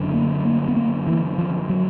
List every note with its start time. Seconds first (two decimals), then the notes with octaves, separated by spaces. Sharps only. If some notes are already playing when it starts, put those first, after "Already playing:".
Already playing: F#1 F#2 D3
0.14 A#3
0.45 A#3
0.68 B3
0.76 A#3
1.07 E3
1.38 F3
1.69 F#3